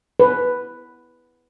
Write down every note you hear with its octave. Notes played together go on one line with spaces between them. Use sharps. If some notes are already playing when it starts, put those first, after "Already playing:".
B4